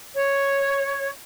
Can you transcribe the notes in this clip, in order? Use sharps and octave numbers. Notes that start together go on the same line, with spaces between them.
C#5